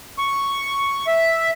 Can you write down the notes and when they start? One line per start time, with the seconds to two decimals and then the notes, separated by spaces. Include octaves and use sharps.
0.18 C#6
1.07 E5